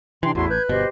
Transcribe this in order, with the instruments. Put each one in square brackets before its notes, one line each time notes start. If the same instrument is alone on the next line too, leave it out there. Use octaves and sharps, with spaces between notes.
[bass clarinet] C3 [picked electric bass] E3 [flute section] D4 G5 C6
[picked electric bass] A1 [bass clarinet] E2 [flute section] E4 F#4 C6
[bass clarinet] B4 [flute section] G6 G#6
[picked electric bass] G1 B2 [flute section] G4 C5 D#5